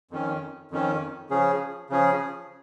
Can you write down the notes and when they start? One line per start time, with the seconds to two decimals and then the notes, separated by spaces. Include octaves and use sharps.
0.11 F2 D#3 C#4
0.71 F2 D#3 C#4
1.30 C#3 F3 C#4 G#4
1.90 C#3 F3 C#4 G#4